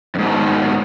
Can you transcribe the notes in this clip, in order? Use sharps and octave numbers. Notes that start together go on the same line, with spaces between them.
F2 G#2 B2 D#3 E3